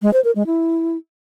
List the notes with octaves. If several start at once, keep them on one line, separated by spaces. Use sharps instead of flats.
G#3
C5
A#4
G#3
E4